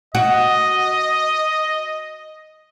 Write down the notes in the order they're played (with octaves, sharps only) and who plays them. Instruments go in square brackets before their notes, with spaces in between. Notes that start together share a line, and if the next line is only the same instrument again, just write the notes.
[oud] F#4 [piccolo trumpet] D#5